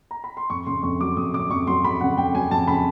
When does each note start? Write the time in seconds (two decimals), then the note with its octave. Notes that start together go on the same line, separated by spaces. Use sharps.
0.11 A#5
0.24 B5
0.37 C6
0.50 F2 C#6
0.67 C#3 C6
0.83 F2 C#6
1.00 F#3 D6
1.17 F2 D#6
1.34 C#3 D6
1.50 F2 C#6
1.67 F#3 C6
1.84 F2 B5
2.01 C#3 F#5
2.18 F2 G5
2.34 F#3 G#5
2.51 F2 A5
2.68 C#3 B5